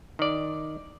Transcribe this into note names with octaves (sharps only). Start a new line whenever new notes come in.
D#3 D5